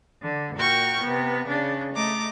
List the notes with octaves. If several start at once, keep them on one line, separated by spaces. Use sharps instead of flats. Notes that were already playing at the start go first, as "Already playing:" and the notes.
D3
A#2 F#4 A#4 G5 C#6 F6
C3 B3
C#3 D4
A3 D#5 A#5 D6